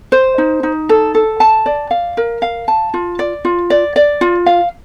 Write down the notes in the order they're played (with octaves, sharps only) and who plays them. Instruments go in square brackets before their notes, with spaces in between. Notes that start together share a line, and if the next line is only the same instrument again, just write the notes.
[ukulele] C5
D#4
D#4
A4
A4
A5
D5
F5
A#4
F5
A5
F4
D5
F4
D5
D5
F4
F5